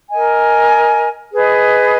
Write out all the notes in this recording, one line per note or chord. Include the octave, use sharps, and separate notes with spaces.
A#4 D#5 G#5
G#4 B4 D#5